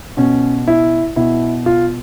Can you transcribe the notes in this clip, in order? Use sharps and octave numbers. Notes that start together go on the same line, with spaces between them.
B2 C#4
E4
B2 E4
F4